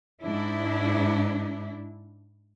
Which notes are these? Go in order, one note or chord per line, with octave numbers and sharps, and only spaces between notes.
G#2 D4 E4